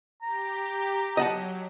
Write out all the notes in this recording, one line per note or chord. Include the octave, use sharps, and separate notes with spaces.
G4 A#5
F#3 D#5 F#5 A5